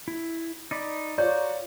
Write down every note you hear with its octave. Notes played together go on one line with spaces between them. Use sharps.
E4
D#4 D5 B5
F4 F#4 C#5 D5 A#5 G6